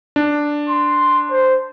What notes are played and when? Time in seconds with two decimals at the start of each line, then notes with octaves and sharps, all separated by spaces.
0.16 D4
0.69 C6
1.31 C5